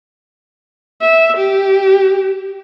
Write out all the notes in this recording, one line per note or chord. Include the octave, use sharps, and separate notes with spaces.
E5
G4